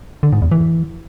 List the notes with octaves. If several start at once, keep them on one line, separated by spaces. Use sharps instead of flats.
D3
G#2
E2
E3